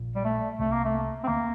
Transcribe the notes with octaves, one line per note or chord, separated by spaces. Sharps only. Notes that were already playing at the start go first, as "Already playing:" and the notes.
Already playing: A#1 A#2
G3
A3
C2 C3 A3
A#3
A3
C4
D2 D3 A#3